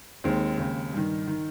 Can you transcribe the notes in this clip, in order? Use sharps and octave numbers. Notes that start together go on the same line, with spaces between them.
D#2 D#3 G#3 C4
D#2 C#3
G2 D#3
D#3